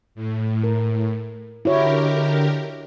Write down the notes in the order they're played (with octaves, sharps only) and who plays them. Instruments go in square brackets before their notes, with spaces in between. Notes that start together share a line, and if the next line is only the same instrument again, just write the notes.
[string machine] A2
[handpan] A#4
[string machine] D3 G4 A#4 [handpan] E4 F#4 C#5
[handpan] D#5